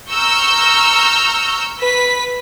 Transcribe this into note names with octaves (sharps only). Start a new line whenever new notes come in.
A#5 C#6 E6 F6 G6
B4 B6